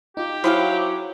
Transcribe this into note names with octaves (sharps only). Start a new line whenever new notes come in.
D#4 F4 G4
F#3 E4 G#4 C5 F5 G5